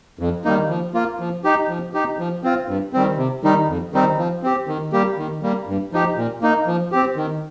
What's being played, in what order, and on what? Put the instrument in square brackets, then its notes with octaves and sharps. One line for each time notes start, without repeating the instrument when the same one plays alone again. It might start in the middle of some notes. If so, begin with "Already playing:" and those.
[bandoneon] F2
D#3 G3 A#3 D#4
F3
A#3 F4
F3
D#4 G4
F3
D#4 G4
F3
C4 F4
G2
D#3 G3 C4
C3
D#3 G3 D#4
F2
D#3 G3 C4 D#4
F3
C4 G4
D#3
G3 A#3 G4
D#3
G3 A#3
G2
F3 D#4 G4
A#2
A#3 D#4
F3
C4 G4
D#3